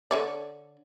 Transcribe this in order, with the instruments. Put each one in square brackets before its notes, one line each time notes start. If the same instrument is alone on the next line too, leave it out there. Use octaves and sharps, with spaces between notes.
[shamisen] D3 C#5 D5